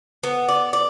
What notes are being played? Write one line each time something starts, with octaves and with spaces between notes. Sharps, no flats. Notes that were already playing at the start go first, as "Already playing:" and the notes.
B3
D5
D5